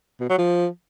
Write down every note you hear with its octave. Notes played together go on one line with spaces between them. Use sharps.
B2
F#3
F3